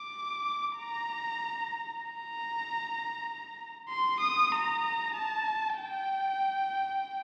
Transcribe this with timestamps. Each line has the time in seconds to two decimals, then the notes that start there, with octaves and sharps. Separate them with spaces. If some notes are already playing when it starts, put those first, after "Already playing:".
Already playing: D6
0.78 A#5
2.02 A#5
3.89 C6
4.21 D#6
4.52 A#5
5.14 A5
5.77 G5